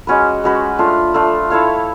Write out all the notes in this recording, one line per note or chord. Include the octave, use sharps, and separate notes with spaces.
G#3 C#4 F#4 B4
G#3 C#4 F#4 B4
A3 D4 F4
A3 D4 F4
E4 A4 C#5 F5